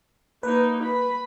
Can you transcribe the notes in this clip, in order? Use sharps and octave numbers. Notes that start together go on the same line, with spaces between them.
A#3 D#4 B4
B5